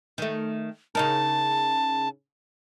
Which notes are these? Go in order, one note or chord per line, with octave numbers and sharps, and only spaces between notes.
D#3 A3
C#3 D#4 A#4 A5